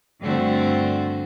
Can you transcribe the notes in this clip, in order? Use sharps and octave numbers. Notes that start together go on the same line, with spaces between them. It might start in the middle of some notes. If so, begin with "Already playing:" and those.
G2 D3 A3 C4 F#4